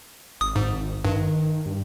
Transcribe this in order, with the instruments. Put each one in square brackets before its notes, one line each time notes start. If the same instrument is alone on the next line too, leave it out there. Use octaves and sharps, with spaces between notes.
[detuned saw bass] G#1 [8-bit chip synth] D#6
[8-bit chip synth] G#2
[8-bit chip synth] G2 [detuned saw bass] D#3
[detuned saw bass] G2